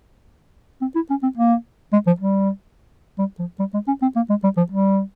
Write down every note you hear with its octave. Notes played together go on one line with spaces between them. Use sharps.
C4
E4
C#4
C4
A#3
G#3
F3
G3
G3
F3
G3
G#3
C#4
C4
A#3
G#3
G3
F3
G3